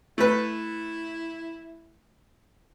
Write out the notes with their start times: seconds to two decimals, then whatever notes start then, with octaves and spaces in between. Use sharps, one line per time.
0.18 A3 E4 B4